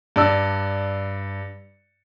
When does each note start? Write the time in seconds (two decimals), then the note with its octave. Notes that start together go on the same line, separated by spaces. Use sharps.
0.16 G2 D5 E6